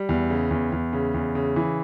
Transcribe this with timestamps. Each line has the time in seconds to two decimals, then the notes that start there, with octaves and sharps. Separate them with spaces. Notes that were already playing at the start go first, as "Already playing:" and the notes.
Already playing: G3
0.09 E2
0.30 C#3
0.51 E2
0.72 E2
0.93 C#3
1.14 E2
1.35 C#3
1.56 E3